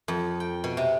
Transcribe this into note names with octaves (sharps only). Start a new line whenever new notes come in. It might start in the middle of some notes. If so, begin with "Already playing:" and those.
F2
G5
B2
C3